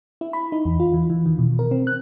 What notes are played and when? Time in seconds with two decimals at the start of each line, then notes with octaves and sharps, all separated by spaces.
0.21 E4
0.33 B5
0.52 D#4
0.65 E2
0.80 F4
0.93 E3
1.10 E3
1.26 D#3
1.39 B2
1.59 A#4
1.71 C4
1.87 F#6